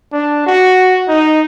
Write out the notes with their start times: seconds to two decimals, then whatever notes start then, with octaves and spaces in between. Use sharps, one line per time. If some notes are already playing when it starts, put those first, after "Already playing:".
0.13 D4
0.47 F#4
1.09 D#4